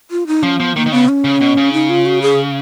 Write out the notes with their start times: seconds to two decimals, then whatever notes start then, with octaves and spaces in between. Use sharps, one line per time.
0.11 F4
0.27 D#4
0.43 F3 C#4
0.59 F3 B3
0.75 D#3 A#3
0.86 D#3
0.92 C#3 B3
1.09 C#4
1.24 C#3
1.41 B2
1.57 C#3
1.73 D#4
1.89 F4
2.06 F#4
2.22 G#4